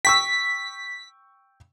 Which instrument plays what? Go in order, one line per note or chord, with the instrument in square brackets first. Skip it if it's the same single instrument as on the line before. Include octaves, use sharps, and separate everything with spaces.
[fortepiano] G5 C#6 E6 [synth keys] B6